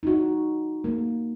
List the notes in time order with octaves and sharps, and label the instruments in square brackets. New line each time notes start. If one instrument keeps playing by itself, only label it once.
[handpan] D#4 F#4
A#3